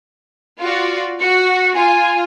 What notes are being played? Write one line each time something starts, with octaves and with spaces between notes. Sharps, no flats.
F4 F#4 D5
F#4 C#7
F4 G#5